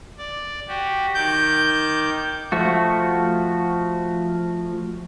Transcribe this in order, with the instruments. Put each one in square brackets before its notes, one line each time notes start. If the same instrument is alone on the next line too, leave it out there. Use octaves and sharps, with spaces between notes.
[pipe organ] D5
F#4 G4
[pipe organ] D#3 D6 [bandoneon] G6
[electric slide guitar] F3 A3 F#4